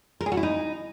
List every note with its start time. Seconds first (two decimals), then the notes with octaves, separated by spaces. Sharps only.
0.21 A#4
0.26 G#4
0.32 F#4
0.37 E4
0.43 D#4